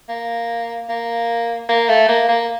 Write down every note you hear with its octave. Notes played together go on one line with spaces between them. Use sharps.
A#3
A#3
A#3
A3
A#3
A#3